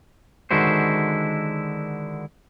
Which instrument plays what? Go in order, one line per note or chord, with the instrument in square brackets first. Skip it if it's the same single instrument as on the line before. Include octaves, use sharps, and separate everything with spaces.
[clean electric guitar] D3 D#3 G#3 E4 F#4 C5